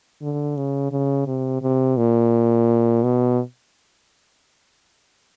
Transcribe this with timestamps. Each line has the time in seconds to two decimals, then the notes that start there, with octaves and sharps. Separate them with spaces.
0.22 D3
0.57 C#3
0.92 C#3
1.27 C3
1.62 C3
1.97 A#2
3.03 B2